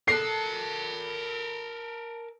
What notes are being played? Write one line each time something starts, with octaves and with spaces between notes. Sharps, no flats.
A4 A#4 A5 F#6 C7